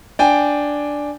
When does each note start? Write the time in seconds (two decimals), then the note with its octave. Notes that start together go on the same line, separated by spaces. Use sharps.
0.19 D4 G5 G#5